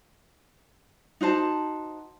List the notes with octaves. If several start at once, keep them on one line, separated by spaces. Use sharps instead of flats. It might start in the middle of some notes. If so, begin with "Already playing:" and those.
D#4 F#4 C5 A5